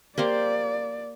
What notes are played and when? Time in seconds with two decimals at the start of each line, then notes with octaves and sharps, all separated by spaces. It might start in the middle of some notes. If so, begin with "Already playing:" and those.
0.18 A#3 G4 C5 D5